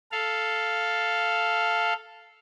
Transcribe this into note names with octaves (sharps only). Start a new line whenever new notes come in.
A4 F5